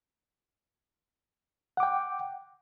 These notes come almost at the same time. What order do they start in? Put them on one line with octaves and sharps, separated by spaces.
F#5 D6 G5